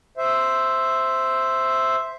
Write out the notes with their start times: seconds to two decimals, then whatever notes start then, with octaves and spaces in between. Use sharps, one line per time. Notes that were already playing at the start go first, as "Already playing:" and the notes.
0.17 C5 E5